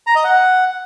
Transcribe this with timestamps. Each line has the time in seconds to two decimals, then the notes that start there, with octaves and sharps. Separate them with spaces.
0.07 A#5
0.15 D#5
0.24 F#5